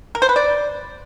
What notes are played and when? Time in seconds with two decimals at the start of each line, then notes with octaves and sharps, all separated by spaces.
0.15 A#4
0.22 C5
0.29 B4
0.36 D5